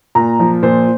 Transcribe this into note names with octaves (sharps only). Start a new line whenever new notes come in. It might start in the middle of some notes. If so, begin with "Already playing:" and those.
A#2 A#5
F3
A#2 C5